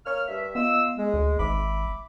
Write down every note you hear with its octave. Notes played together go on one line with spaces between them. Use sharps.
A#3 C#5 F6
G2 E5
B3 F4 D#5 E6
G#3
D2
G#1 E5 B5 D6